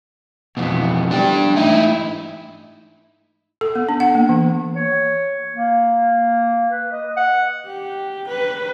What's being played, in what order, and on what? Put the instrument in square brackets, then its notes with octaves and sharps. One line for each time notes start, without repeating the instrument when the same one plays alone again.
[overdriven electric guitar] F2 B2 [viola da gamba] E3 B3
[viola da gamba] D3 G3 [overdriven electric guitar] D4 G4
[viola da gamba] G#2 E3 A3 [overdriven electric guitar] D#4 E4
[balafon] A4
B3
D4
F#5
A#3
E3
[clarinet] C#5
A#3
B4
D#5
F#5
[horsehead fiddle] G4
B4